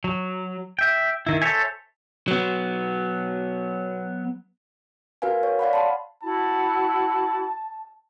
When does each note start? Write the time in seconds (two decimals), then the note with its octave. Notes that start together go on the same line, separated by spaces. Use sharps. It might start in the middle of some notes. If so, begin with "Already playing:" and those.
0.04 F#3
0.79 E5 G5
1.27 D#3 E4
1.42 A4 C5 C#5 E5 G#5
2.28 F#3 B3
5.22 F#4 A#4 B4 F5 G#5
5.43 C#5
5.59 D5 F5 F#5 B5
5.73 A5 B5 C6
6.23 E4 F#4 A5 B5